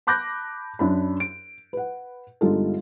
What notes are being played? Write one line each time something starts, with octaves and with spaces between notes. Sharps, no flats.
A5 B5 D6 F#6 G6 A#6
F#2 D4 B5
D7
B4 F#5
G1 G3 G#3 D#4 F4 A4